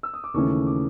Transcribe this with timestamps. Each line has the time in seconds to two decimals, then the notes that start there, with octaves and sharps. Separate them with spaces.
0.03 E6
0.14 D#6
0.24 D6
0.34 D#2 C#3 E3 A3 C#4 C#6
0.66 D6